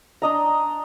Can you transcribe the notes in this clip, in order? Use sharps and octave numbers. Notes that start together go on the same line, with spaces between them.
D4 D#5 A#5